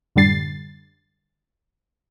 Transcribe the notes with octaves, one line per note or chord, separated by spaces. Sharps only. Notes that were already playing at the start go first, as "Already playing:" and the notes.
F#2 A2 D3 G3 A6 C7